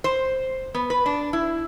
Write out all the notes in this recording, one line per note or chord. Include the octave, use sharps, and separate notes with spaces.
C5
B3
B4
D4
E4